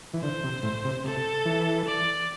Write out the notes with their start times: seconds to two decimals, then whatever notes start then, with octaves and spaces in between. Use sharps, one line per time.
0.13 E3
0.22 D3 C5
0.43 C3
0.63 A2
0.85 C3
1.04 C3 A4
1.45 E3
1.87 D5